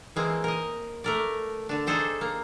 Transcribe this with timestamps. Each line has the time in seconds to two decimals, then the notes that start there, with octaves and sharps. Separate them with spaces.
0.16 E3 G#3 A#3 C4
0.44 A#4 D#5
1.04 A3 A#4 D5
1.69 D3 D4
1.87 D4 D#4 G#4 A4 C5 G5
2.21 A#3